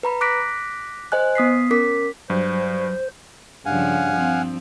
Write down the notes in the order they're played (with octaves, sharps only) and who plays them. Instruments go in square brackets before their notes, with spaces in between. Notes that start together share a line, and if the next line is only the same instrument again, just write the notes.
[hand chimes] B4 A#5 B5
D6 F#6 A#6 B6 D7
C5 D#5 G#5 F#6
B3 D#6 B6 C7
C#4 A#4 D6 B6
[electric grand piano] G2 [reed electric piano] F#3 [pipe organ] C5
[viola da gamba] G2 C#3 F3 [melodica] F5 F#5 G#5
[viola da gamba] F3 C4